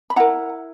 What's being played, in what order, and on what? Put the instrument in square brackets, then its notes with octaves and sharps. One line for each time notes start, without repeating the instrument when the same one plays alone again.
[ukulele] B5
E4 A#4 F#5 A#5